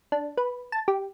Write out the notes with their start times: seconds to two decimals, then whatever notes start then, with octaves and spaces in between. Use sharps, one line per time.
0.12 D4
0.37 B4
0.72 A5
0.88 G4